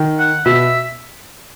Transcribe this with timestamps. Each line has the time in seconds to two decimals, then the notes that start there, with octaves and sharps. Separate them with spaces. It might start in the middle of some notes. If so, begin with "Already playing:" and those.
Already playing: D#3
0.19 F#5
0.45 B2 E5